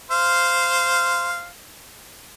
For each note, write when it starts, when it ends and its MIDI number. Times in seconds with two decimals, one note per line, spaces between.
0.11 1.48 72
0.11 1.48 77